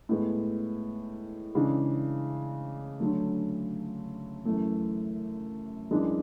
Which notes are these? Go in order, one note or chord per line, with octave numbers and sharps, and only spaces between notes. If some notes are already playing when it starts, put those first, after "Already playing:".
A2 G#3 B3
C#3 E3 G#3 D4
D3 F#3 A3
F#2 E3 A3
F#2 E3 G#3 D4